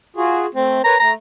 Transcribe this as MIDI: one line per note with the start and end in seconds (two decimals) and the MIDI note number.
0.16 0.46 65
0.16 0.46 66
0.16 0.46 68
0.55 0.78 57
0.55 0.81 60
0.84 0.95 70
0.84 0.95 71
0.84 0.95 73
0.84 0.98 82
1.00 1.14 57
1.00 1.11 82